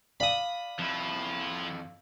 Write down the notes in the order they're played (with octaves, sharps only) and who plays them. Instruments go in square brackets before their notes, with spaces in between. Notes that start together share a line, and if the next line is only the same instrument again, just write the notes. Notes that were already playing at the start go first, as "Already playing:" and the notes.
[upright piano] D5 F5 [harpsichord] B5 D#6
[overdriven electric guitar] F2 E4 [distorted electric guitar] F3